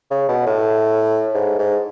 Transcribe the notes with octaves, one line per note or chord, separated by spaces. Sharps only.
C#3
B2
A2
G#2
G#2